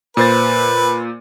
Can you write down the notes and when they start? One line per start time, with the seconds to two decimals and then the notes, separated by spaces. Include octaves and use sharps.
0.17 A#2 B4 C5 A6